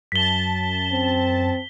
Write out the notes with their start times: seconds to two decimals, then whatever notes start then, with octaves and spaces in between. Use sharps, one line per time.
0.12 F#2 A5 B6 G7
0.92 C4